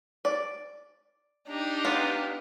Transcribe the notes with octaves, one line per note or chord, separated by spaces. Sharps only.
D5
D4 D#4 G4
B3 F4